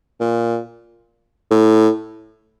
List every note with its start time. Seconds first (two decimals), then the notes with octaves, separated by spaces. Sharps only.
0.20 A#2
1.50 A2